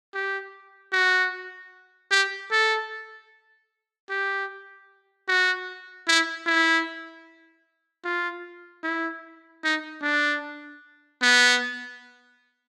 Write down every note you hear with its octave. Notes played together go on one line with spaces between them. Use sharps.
G4
F#4
G4
A4
G4
F#4
E4
E4
F4
E4
D#4
D4
B3